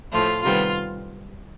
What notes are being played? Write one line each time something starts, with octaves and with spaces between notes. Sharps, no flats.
A2 F3 A3 F4
C3 D#3 G3 B3 F4